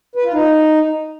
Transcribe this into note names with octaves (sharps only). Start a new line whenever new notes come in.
B4
F4
D#4